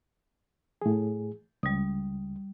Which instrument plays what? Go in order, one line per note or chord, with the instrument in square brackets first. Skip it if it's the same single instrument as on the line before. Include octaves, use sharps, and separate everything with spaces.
[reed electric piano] A2 G#4
[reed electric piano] C#2 [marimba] G3 D#6